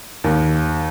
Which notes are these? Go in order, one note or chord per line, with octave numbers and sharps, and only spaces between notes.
D#2 D#3